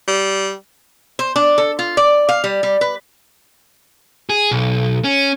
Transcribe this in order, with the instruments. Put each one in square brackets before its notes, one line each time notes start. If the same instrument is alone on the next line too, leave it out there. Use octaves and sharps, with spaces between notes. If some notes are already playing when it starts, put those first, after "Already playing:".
[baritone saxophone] G3
[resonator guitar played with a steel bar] C5
D4
A4
F4
D5
F5
G3
G3
B4
[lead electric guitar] G#4
B1
C#4